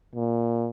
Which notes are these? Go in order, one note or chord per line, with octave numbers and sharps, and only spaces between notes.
A#2